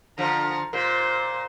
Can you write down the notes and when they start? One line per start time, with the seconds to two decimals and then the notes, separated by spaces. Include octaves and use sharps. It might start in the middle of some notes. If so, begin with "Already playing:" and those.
0.18 D3 F3 A#5
0.73 A#2 C5